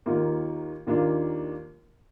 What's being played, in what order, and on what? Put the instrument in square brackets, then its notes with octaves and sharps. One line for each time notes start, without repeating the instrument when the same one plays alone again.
[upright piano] D#2 D#3 A#3 F4
D#2 D#3 A#3 D4 F4